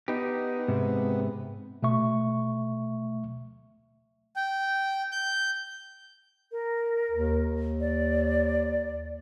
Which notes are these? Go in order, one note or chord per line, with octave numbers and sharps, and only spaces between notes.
B3 D#4 G4
G#2 C3
B2 A3 E5 C#6
G5
G6
A#4
D#2
D5